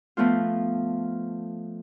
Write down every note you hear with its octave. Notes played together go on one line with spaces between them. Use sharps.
F3 A3 B3 F4